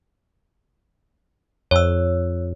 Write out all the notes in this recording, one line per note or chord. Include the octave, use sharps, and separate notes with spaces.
F2 C#5 E6